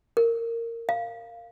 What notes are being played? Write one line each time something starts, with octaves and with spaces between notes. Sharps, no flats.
A#4
F5